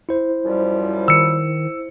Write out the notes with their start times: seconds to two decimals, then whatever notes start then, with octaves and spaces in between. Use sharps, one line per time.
0.09 E4 C5
0.45 F#2 F3 G3
1.08 D#3 E6 C#7